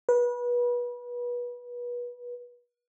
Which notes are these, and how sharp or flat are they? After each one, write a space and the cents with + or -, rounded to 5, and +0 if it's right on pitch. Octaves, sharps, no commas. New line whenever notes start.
B4 -30